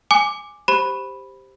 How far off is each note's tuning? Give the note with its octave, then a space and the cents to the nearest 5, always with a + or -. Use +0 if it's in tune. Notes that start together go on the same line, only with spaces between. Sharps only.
G#5 -5 D6 +5
G4 +0 C5 +0 B5 +0